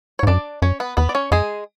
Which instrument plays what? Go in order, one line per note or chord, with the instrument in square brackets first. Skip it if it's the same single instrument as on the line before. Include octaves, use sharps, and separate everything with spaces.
[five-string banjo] C#5
[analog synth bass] G#2
[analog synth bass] F#2 [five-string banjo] D4 D5
[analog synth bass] F#2 [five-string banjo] C#4 C#5
[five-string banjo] B3 B4
[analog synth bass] E2 [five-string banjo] B3 B4
[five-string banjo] D5
C#4 C#5
[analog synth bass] F#2 [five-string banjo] G#3 G#4